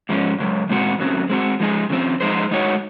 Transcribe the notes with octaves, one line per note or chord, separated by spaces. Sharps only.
G#2 F3 G#3 C#4
F#2 C#3 G#3
A#2 G#3 C4 F#4
F#2 C#3 F#3 C4
G#3 C4 F#4
F3 G#3 D#4 G#4
C#3 F3 C4
F3 G#3 D#4 G#4 C5
G#3 D#4 F#4 C#5